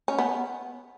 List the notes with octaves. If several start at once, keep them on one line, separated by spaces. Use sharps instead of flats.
C#4
B3